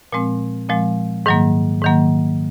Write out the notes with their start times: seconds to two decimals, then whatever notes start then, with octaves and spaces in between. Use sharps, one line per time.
0.12 A#2 F3 G#3 C4
0.69 A#2 F3 G#3 C4
1.26 G#2 D#3 F#3 A#3
1.82 G#2 D#3 F#3 A#3